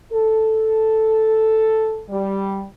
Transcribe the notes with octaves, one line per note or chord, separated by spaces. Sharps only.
A4
G3